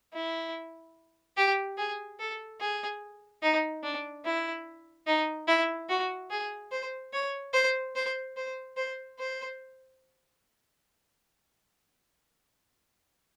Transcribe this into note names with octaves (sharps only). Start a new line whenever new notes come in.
E4
G4
G#4
A4
G#4
D#4
D4
E4
D#4
E4
F#4
G#4
C5
C#5
C5
C5
C5
C5
C5